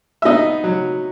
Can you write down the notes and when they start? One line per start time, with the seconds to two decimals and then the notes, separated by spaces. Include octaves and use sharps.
0.22 E5
0.25 B3 D#4 D#5
0.64 F#3